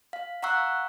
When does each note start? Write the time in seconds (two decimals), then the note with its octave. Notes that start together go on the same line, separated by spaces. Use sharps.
0.13 F5
0.42 F5 F#5 A#5 C#6 E6 F#6